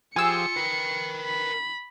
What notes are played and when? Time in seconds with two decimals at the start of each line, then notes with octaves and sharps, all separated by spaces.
0.16 F3 F4 G4 G#4 G#5 E6 C#7
0.56 A#4 B4 G5
1.25 B5